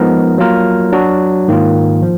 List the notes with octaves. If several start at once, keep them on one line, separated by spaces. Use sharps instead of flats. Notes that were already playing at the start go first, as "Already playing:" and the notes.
Already playing: F3 G#3 B3 D#4 A#4
F#3 A#3 F4 A#4
F#3 D4 F#4
G#2 D#3 A#3 F4
F3